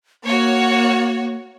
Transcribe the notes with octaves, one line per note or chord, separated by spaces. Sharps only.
A#3 F#4 C#5